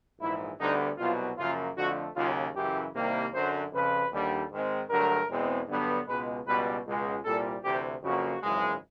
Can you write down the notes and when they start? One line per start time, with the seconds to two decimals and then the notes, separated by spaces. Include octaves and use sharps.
0.20 A#1 G#2 E3 E4
0.60 D2 D3 G3 B3 D#4
0.98 C2 B2 F#3 F4
1.38 F#2 C#3 F3 A#3 F4
1.76 F2 D3 F3 A3 F#4
2.16 D#2 C#3 F#3 F4
2.55 F#2 C#3 E3 G4
2.95 C2 C3 D#3 G3 A#3
3.33 F#2 D3 F#3 C5
3.72 F2 C#3 F3 B4
4.12 D#2 D3 G3
4.51 G#2 D#3 G#3 C4
4.90 G2 D3 F#3 A3 A#4
5.29 E2 B2 G#3 C4
5.68 G2 D3 F#3 B3
6.07 C#2 B2 G#3 B4
6.47 C#2 B2 G3 B4
6.86 C#2 B2 G#3
7.24 C2 A#2 G3 A4
7.64 D2 C3 E3 G4
8.03 F2 C#3 F#3 A#3 F#4
8.42 G#1 F#2 C#3 E3 G#3